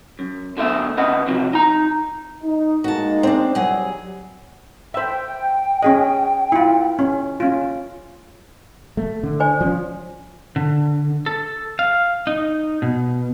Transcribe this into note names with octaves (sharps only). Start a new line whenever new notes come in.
F#2
B2 D3 A3 E5
C#3 B4 D#5 F#5
C3 F3 F#3
D#4 A#5
D#4
G#3 A#3 D#4 F#4 A5
C4 D4
F#3 G3 G#4
C5 E5 G5
C#4 G#4 D#5
E4 F4
C#4
C#4 F4
A3
D3
C5 D5 G#5
F3 C#4
D3
A4
F5
D#4
B2